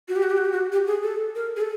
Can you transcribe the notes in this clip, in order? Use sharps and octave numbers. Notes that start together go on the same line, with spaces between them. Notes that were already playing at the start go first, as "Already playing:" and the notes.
F#4
G4
F#4
G4
F#4
G4
F#4
G4
G#4
A4
A#4
G#4
A4